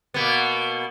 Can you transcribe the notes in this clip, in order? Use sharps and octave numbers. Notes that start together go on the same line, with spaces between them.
B2 A#3 B3